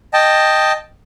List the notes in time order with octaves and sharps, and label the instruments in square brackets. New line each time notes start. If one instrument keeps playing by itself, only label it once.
[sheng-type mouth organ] D#5 G5 A5